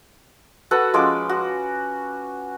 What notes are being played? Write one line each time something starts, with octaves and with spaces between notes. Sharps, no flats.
F#4 A4 B4 F#5
F3 G#3 C#4 D6
F#4